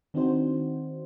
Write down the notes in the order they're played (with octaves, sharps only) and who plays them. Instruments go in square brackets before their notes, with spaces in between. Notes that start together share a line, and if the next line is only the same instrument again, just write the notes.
[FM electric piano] D#3 C4 D4 D#4 F#4 C5